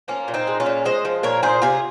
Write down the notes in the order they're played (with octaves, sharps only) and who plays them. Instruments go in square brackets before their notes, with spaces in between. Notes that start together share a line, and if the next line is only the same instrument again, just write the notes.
[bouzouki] F3 A#3 C#4
A#2
C4 D#4
G#3
C#4 F4
A#2
G#3 C5 D#5
F3
A#2 A#4 C#5
A#2 G#4 C5
C3 F4 G#4